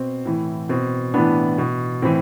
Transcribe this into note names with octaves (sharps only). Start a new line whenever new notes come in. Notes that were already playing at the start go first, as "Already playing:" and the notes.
Already playing: B2 C4
A2 E3
B2 C4
A2 E3 B3 D4
B2
A2 E3 C4